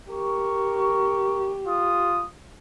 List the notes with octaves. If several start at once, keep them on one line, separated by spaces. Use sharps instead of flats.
G4 A#4 C#6
F4 D#6